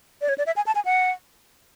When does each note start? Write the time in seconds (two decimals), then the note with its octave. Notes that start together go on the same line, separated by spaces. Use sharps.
0.21 D5
0.29 C#5
0.38 D5
0.46 E5
0.56 G#5
0.66 A5
0.75 G#5
0.85 F#5